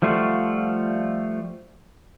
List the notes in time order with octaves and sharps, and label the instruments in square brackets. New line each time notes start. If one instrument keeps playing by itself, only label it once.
[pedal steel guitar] F3 G3 A3 F4 F#4